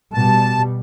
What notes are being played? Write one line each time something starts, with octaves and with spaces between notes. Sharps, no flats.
B2 G3 A5